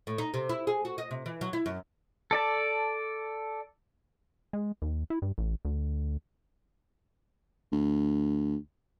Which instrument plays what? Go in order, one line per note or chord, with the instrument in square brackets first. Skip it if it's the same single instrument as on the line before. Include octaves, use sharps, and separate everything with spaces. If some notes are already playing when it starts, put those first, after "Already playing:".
[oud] A2
D#4
C3
E4
G#4
F#4
D#5
C3
E3
F#3
E4
F#2
[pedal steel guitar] A4 D5 A5
[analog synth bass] G#3
D#2
E4
G2
A1
D2
[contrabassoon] D2